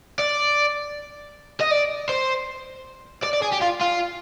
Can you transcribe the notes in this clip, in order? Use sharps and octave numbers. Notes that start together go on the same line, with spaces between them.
D5
D#5
D5
C5
D5
D5
G#4
G4
F4
F4